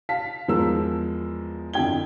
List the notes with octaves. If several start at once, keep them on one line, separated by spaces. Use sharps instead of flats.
F5 A5 B6
E2 F3 G#3 A#4 E6
F2 D3 E4 G5 G#6 G7